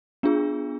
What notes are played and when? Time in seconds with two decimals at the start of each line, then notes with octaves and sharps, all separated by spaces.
0.23 B3 D4 F4 G#4